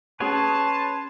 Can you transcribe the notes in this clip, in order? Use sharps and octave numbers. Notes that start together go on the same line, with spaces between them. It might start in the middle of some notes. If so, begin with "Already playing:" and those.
C#4 G#4 B4 C#5 G5 A5 C6